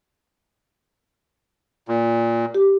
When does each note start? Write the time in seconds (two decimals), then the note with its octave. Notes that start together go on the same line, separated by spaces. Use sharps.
1.88 A#2
2.55 G4